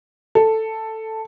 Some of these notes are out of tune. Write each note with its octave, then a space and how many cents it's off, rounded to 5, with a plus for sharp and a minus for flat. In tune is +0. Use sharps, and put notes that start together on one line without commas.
A4 +5